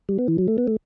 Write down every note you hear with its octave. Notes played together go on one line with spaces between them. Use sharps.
G3
B3
E3
F#3
A3
B3
A3